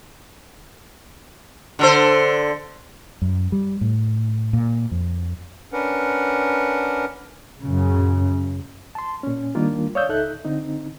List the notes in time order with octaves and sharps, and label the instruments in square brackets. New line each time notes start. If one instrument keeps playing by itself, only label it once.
[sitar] D3 A4 C5
[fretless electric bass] F#2
G3
A2
A#2
F2
[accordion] C#4 D4 A#4 B4 F#5
[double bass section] F#2 C#3
[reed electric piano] A5 C6
A#2 C#4
D#3 G3 A#3 D4 F4 A#4
C#5 D5 F5 D#6 E6 G6
C#2 D#4 A4 E5 F#6 G6
D3 C4 D#4